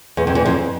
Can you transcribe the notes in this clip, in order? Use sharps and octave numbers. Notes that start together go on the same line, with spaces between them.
E2
F2
E2
F2